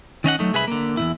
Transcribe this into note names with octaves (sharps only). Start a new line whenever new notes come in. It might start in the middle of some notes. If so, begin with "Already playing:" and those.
D#3 C#4 D#5 F#5
F#3 A3 D#4
C2 G#4 B4 E5 B5
D3 A#3
E2 B2 E4